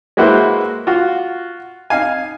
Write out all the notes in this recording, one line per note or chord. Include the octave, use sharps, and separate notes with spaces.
G#3 A#3 E4 F#4 B4 C5
F4 F#4
D#4 F5 G#5